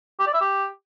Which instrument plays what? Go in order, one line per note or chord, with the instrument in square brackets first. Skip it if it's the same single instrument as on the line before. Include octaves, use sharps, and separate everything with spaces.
[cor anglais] G4
D5
E5
G4